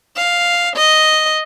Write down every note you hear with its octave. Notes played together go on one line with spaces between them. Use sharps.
F5
D#5